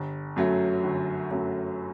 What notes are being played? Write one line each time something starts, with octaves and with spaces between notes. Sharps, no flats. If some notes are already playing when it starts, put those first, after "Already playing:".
Already playing: G1
F#2 F#3 A3
G1
F#2 F#3 A3